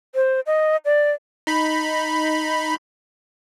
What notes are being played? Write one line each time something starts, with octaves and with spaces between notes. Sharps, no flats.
C5
D#5
D5
D#4 B5